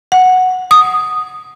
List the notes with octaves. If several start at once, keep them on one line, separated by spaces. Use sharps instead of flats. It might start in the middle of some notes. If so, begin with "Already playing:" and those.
F#5
D#6